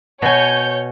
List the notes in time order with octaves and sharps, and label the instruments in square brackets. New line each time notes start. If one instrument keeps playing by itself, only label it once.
[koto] B2 G#5 [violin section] C#5 G6